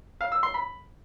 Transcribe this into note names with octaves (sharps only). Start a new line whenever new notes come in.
F5
E6
C6
B5